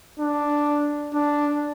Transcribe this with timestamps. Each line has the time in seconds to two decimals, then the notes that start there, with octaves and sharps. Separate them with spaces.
0.19 D4
1.14 D4